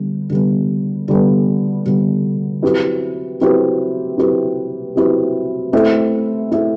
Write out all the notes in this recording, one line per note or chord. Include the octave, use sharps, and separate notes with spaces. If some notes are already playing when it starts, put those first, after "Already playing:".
Already playing: D3 G3 B3
D3 G3 B3
D3 G3 B3
D3 G3 B3
F#3 C4 E4 G4 B4
F#3 C4 E4 G4 B4
F#3 C4 E4 G4 B4
F#3 C4 E4 G4 B4
A3 C4 E4 A4 E5
A3 C4 E4 A4 E5